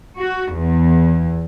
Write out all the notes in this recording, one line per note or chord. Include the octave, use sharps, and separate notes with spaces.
F#4
E2